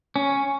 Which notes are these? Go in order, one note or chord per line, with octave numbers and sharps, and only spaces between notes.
C#4